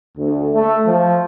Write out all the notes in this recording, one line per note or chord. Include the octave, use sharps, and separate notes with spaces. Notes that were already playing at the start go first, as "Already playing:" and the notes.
D2
A3
F3